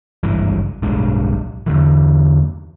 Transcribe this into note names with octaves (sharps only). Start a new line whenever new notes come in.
G#1 C#2 G2 E3
D1 B1 G2 G#3
E2 D3 E3